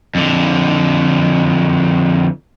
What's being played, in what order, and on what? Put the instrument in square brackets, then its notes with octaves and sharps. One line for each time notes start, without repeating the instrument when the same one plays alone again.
[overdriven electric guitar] F2 D3